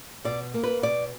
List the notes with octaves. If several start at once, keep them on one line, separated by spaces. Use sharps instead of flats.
B2 D5
A#3
B4
B2 D5